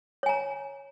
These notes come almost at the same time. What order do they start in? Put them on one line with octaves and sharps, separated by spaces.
C#5 G#5 A#5